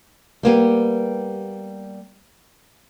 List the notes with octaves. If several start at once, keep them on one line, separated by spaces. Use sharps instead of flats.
G3 A#3 B3 G4